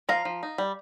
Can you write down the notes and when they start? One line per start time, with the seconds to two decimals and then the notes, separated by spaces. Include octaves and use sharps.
0.09 F3 F5 A#5
0.25 F3
0.43 D#4
0.58 G3